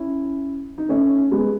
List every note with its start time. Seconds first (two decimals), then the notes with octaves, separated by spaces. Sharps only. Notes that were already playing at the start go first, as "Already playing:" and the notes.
Already playing: C#4 E4
0.78 D#4
0.89 A3 C#4
1.32 G#3 B3